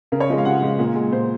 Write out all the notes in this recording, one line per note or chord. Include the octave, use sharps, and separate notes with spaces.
C#3 A#4
C#5
F3 G#3 D#5
F5
C#3 F#5
F3 G#3
A#2
G#3
A#2 C5